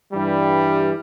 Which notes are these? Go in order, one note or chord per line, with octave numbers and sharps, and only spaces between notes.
G2 E3 G3